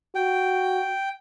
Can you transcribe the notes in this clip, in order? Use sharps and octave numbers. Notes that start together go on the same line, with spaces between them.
F#4 G5